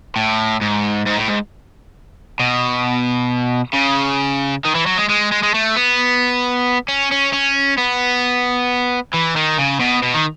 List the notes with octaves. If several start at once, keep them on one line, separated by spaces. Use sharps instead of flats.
A2
G#2
G#2
A2
G#2
B2
C#3
D#3
E3
F#3
G#3
G#3
G#3
G#3
A3
B3
C#4
C#4
C#4
B3
E3
D#3
C#3
B2
B2
D#3